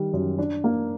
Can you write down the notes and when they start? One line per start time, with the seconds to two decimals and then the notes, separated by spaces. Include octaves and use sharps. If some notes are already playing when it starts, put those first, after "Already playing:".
Already playing: D#3 G3
0.13 F#2
0.39 D4
0.64 A#3